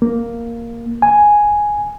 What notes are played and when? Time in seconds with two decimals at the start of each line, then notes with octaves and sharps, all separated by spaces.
0.02 A#3
1.02 G#5